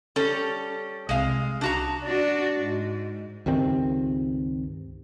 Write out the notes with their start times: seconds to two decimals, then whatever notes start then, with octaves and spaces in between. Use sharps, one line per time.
0.16 G3 C#4 A4
1.09 C2 C3 G#3 F5
1.61 D4 F#4 A#5
2.04 D4 F#4
2.58 G#2
3.46 C#2 G2 D#3 C4